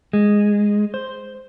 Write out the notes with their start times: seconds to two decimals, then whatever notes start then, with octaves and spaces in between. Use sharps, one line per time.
0.13 G#3
0.94 C5